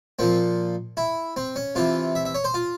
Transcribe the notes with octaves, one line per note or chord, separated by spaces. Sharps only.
A#2 F3 C4
E4
C4
C#4
C3 E3 F4
E5
E5
C#5
C5
F4